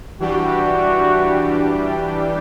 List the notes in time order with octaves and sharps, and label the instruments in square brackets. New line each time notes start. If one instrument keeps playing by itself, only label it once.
[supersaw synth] E3 G3 D4 G4 [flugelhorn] F#4